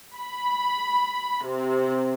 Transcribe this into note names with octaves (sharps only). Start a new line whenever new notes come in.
B5
C3